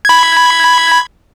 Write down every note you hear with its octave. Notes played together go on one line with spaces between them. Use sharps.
B5 G#6